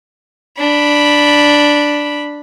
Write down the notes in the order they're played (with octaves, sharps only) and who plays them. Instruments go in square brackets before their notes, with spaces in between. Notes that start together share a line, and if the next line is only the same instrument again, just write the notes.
[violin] D4 B5